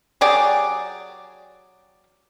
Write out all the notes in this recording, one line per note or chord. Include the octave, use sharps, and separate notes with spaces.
F#3 G4 G#4 D5